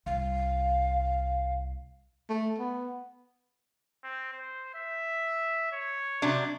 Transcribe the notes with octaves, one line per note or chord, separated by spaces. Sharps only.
C2 F5
A3
B3
C4
C5
E5
C#5
C3 F#3 D4